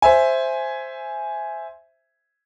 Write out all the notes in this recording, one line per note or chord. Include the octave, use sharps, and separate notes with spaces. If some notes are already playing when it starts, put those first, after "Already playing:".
C5 E5 G#5